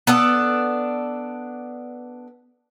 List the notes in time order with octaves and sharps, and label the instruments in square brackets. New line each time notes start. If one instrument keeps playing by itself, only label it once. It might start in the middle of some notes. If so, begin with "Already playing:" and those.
[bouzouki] B3 D4 A4